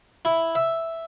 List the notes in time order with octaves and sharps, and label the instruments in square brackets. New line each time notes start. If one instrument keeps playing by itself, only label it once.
[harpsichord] E4
E5